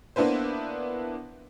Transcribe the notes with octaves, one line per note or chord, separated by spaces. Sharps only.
A#3 B3 D4 E4 B4 C5